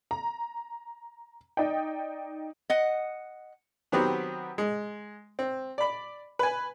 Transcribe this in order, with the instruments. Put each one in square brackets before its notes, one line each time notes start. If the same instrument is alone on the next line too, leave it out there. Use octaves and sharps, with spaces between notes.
[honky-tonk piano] A#5
D#4 D5 D#5 G5
[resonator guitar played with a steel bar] D#5 F#5
[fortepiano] D#3 F#3 B3 C4 F#4 G4
G#3
C4
D5 B5
B4 G#5